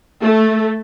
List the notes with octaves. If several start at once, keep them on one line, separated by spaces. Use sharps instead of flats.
A3